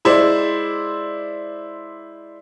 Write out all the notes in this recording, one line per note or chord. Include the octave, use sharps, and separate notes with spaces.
G#3 E4 C5 D5